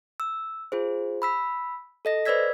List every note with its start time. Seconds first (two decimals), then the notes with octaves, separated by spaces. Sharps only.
0.20 E6
0.72 F4 G#4 C5
1.22 B5 E6 B6
2.05 A4 D#5 A#6
2.26 B4 C5 D5 E6 G#6 B6